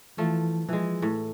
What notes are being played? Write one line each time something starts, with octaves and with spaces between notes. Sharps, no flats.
E3 F3 A3
E3 F3 G#3
A2